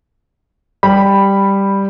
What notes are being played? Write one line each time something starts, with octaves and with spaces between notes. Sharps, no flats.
G3 B5